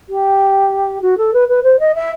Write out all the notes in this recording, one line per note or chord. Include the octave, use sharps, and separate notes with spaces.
G4
F#4
A4
B4
B4
C5
D#5
E5